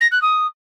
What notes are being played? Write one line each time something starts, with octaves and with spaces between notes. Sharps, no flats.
A#6
F#6
D#6